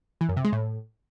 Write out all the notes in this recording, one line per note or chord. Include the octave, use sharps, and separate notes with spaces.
E3
F#2
C3
G#3
A2